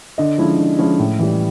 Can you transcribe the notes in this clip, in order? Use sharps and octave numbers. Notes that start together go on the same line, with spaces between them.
D3 D#5
F3 G#3 C#4 E4
D3
F3 G#3 C#4 E4
A2
E3 G3